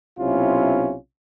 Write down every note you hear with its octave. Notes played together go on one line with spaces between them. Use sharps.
B1 C3 C#4 E4 F4